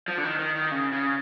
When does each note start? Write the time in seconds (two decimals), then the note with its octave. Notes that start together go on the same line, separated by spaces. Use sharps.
0.08 F3
0.18 D3
0.24 D#3
0.39 D#3
0.55 D#3
0.71 C#3
0.92 C#3